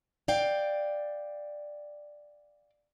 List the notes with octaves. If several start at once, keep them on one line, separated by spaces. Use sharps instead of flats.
D5 F5 G5